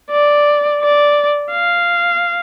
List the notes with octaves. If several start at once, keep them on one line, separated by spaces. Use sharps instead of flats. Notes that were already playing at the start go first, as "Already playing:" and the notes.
D5
D5
F5